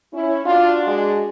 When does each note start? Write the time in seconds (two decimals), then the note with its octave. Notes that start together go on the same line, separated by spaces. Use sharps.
0.14 C#4 E4
0.46 D4 F4 F#4
0.87 G#3